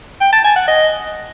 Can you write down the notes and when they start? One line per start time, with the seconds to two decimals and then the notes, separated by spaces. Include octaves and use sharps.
0.21 G5
0.33 A5
0.44 G#5
0.56 F#5
0.68 D#5